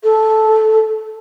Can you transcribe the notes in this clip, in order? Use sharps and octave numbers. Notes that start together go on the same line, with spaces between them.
A4